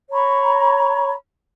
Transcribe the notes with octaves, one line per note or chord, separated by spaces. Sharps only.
C#5 A#5 B5 C#6